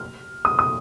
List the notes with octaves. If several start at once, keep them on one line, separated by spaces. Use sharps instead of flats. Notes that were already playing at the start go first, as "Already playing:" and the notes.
Already playing: F6
D#6
D#6